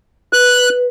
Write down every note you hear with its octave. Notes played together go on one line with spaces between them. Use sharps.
B4 F#6